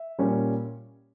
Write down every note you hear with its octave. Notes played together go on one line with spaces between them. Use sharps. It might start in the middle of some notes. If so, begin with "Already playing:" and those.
Already playing: E5
A#2 G3 C#4